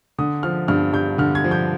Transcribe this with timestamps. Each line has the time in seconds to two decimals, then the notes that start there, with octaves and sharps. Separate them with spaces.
0.19 D3 D#6
0.43 F3 F6
0.68 G2 F6
0.93 G2 G6
1.18 D3 F6
1.35 G#6
1.44 F3
1.51 G6